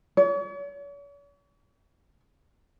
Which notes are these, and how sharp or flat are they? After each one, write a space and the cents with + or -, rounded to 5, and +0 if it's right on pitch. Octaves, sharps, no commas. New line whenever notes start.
C#5 +45